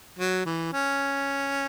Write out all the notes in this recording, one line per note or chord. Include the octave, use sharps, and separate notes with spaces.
F#3
E3
C#4